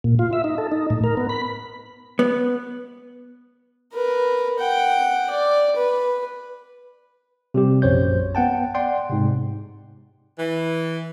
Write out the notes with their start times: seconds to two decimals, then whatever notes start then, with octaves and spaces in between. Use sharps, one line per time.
0.04 A#2
0.19 F4
0.33 E5
0.44 D#4
0.58 A4
0.72 D#4
0.90 A2
1.04 A#4
1.17 B3
1.29 B5
2.19 B3
3.93 A#4 B4
4.59 F#5 G5
5.30 D5
5.76 B4
7.54 C3 G3 G4
7.82 A#1 F#2 C5 C#5 G6
8.35 B3 F#5 G5 A5
8.75 D5 F#5 G5 C6
9.10 G#2 C3
10.39 E3